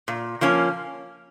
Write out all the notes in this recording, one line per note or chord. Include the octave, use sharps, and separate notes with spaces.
A#2
F3 A#3 C#4